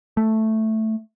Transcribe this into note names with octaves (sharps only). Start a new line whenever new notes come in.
A3